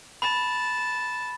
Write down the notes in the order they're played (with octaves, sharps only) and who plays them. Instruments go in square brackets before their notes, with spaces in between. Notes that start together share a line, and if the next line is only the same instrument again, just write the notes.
[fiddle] A5 [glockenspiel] B5